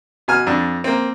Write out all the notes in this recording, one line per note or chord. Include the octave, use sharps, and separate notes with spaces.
B2 G#5 F6
F2 D4
A#3 C4